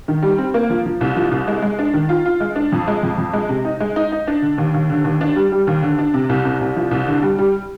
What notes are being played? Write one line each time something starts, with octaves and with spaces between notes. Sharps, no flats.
D#3
G3
C4
A#3
F3
F3
C2
F3
C2
G#3
G#3
D4
D#3
F4
F4
G#3
D4
F2
G#3
F2
F2
G#3
C3
D#4
G#3
D#4
D#4
D4
D3
D#2
D#2
D3
D#2
D4
G3
G3
D#2
D3
D4
C3
C2
C3
C2
F3
C2
D3
G3
G3